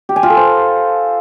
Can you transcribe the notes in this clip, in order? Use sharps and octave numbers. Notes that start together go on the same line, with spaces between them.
G4
G#5
F4
A4
C5